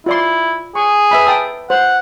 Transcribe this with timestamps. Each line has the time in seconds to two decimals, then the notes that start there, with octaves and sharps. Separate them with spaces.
0.06 E4 F4 D5 C6
0.75 G#4 C#6
1.11 B4 E5 B5
1.27 G5 A5 D#6
1.70 C5 F#5